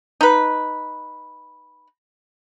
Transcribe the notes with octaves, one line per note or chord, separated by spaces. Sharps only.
D#4 B4